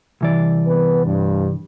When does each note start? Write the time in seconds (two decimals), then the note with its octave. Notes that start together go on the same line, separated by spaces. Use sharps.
0.21 C2 E3 D5
0.66 B3 B4
1.05 G2